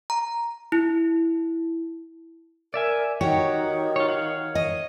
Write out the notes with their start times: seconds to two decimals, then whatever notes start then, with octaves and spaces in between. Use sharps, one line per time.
0.10 A#5
0.72 E4
2.74 A#4 D5 E5 G#5
3.21 D#3 F#4 G4 C#5
3.96 F4 C#5
4.08 C#5 F5 F#5
4.55 D#5